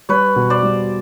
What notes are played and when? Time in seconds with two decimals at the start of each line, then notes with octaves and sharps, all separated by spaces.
0.09 G3 B4 C#5
0.36 B2
0.50 C5 D5
0.63 G3